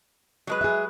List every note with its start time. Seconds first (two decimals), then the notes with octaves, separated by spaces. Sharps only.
0.47 F#3 G#3 B4
0.61 G#4 E5